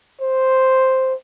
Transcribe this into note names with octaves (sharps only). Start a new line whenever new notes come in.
C5